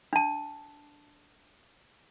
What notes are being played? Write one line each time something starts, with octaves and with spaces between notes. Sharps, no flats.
D4 A5